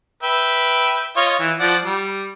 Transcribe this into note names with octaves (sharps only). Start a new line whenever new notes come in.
B4 E5 G5
F4 C#5 D#5
E3
F3 D5 F#5
G3